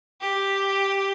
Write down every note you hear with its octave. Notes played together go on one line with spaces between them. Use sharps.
G4